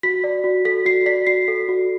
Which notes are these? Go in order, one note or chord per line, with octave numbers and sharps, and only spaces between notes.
F#4 B6
D5
F#4
A4 B6
F#4 C7
D5 B6
F#4 C7
A4
F#4